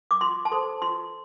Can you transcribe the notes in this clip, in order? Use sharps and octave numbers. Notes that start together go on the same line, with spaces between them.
D6
F4 C6
A5
A4 C5 C6
F4 C6